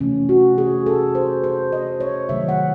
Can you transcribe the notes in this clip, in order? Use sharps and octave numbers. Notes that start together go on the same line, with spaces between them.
C3 E3 A3 C#4
F#4
G#4
A4
C5
C5
D#5
C#5
C3 D#3 F#3 A3 E5
F#5